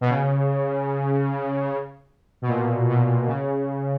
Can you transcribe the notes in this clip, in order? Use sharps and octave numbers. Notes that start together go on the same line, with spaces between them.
B2
C#3
B2
A#2
B2
C#3